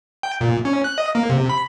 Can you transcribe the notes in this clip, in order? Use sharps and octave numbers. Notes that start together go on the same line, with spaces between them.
G5
A#2
C#4
F#6
D#5
A#3
C3
B5